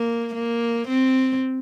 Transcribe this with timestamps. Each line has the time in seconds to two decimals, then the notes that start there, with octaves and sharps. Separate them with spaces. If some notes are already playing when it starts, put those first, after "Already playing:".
Already playing: A#3
0.35 A#3
0.88 C4